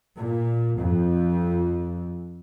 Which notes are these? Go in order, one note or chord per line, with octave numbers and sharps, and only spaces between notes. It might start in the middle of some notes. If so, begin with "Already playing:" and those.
A#2
F2